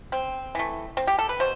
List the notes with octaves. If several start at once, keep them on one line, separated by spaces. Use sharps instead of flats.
C4
E3 A3
C4
G4
A4
B4
B2 C5